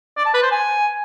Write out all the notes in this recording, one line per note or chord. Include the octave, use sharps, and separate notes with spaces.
D5
A5
B4
C5
G#5